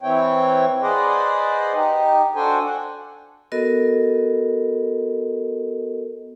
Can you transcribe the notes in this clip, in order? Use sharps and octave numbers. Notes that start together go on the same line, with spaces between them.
E3 C4 E4 C#5 G5
G#4 B4 C5 D5 D#5 F#5
D#4 G4
D4 F#4 A4 C5 G5 G#5
F#5
B3 F#4 A4 A#4 D#5